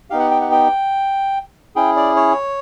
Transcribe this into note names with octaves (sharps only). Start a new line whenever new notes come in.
B3 D#4 G4 F5
F#5
G5
F#5
G5
C#4 E4 G#4 G5
D5
C#5